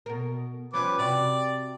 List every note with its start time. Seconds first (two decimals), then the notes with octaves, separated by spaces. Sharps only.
0.06 B2 A#4
0.73 F3 G3 C#4 B4 D6
0.99 C3 F#4 D5